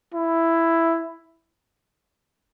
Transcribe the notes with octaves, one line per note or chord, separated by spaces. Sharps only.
E4